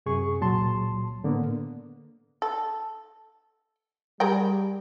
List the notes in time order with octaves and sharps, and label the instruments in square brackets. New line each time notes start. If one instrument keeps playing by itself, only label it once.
[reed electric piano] F#2 C3 G#4 C#6
C#2 A#2 F#3 A5 C6
A2 D3 A#3 B3
[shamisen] A4
[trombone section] G3 [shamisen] G#4 A#4 G5